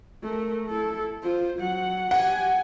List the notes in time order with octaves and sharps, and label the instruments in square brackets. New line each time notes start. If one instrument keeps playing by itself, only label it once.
[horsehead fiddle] A3 A#4
E4 A4
F4 C5
F#3 F#5
[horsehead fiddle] G4 G#5 [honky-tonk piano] F#5